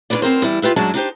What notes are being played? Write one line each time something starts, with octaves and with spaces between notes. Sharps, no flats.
C#4 D4 F4 G#4 B4 D5
F#2 C4 A#4 C5
E2 G3 E4
F4 G4 B4 E5
F#2 F#3 G#3 D4 F#4 A5
D4 D#4 G4 C5